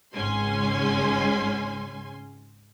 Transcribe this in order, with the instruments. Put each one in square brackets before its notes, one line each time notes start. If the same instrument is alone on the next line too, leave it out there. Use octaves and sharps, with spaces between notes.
[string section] G#1 C#2 G#3 C#4 G#5 C6